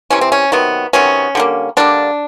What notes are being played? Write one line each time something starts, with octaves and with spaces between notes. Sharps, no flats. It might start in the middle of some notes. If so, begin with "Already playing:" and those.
C3 E3 G3 C#4
C4
C#4
C3 D#3 F#3 B3
C3 D#3 F#3 B3 C#4
D3 G3 A#3
D3 G3 A#3 D4